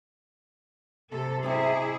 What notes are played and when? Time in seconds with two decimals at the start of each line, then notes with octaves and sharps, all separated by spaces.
1.11 C3 A4
1.43 C3 E4 G#4 D#5 D6